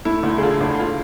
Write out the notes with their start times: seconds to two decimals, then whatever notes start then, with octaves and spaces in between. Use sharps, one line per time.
0.05 A3 E4
0.23 D2
0.38 G#4
0.42 D3 F4
0.61 D2
0.79 F4